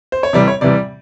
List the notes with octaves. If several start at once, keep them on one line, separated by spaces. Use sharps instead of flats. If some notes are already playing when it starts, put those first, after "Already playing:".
C5
C#5
C3 E3 G3 D5
C#5
C3 E3 G3 D5